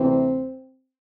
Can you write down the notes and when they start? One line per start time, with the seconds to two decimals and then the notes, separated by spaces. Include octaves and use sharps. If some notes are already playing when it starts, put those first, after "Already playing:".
Already playing: D2 C3 E3 C4